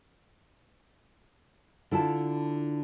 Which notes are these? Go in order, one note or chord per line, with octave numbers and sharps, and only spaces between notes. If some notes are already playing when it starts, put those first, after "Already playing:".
D3 E4 F4 A5